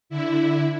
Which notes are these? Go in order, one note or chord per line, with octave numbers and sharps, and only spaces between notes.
D3 E4